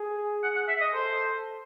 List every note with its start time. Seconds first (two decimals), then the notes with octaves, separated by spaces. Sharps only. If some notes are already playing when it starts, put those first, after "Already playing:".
Already playing: G#4
0.43 F#5
0.55 F#5
0.68 E5
0.81 D#5
0.93 A4 C5